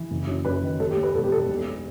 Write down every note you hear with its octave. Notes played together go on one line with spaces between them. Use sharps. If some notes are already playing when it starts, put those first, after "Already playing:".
Already playing: E3
F#1
F#2
F#2 B4
D#3
D#2 A4
G4
D#2
B4
E1 A4
G4
E1 A4
B1